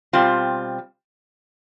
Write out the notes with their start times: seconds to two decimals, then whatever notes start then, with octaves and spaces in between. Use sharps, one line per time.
0.13 B2 G3 C4 F4